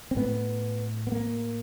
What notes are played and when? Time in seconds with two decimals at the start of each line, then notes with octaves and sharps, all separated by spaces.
0.11 C4
0.16 A2 B3
1.07 B3
1.12 A#3